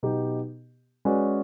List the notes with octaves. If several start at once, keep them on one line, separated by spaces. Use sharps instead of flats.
B2 F#3 B3 D#4 G4
G#3 C#4 F#4 B4 D5